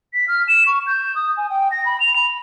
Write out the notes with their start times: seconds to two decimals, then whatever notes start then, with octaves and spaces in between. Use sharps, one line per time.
0.13 B6
0.28 F6
0.48 E7
0.66 C#6
0.87 G6
1.15 D#6
1.37 G#5
1.50 G5
1.71 A#6
1.86 B5
2.00 F7
2.16 B5